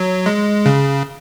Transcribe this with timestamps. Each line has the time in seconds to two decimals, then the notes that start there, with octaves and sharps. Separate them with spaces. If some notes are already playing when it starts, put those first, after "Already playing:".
Already playing: F#3
0.26 G#3
0.66 C#3